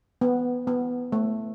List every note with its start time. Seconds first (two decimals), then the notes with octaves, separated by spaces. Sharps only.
0.21 B3
0.67 B3
1.12 A3